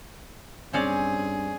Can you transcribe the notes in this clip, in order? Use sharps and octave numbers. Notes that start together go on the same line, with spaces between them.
G2 C4 C#4 G#4 D5